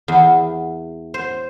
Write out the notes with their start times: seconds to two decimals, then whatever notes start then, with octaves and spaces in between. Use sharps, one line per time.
0.08 E2
1.14 C5